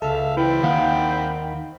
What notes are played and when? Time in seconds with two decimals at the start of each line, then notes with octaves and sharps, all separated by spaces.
0.02 C#2 A4 E5 F5
0.37 E3 C4 G5 B5
0.63 D#2 D#3 C5 F5 F#5